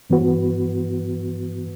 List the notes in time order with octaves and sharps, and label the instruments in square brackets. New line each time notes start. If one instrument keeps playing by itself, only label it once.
[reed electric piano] G2 E3 B3 F#4 B4